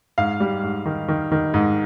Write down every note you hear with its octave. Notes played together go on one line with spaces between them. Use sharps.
G#2 F5
G3
G#2
D#3
D#3
D#3
G#2